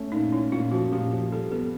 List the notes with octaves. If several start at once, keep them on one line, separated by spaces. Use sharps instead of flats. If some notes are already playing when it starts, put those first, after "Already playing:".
Already playing: A3 C#4
A#2 D#4
C#4 E4
A#2 F4
F3 F#4
A#2 G4
F3 G4
G3 A4
B3 A4